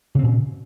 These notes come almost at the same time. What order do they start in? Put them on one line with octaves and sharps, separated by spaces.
C#3 C4 A#2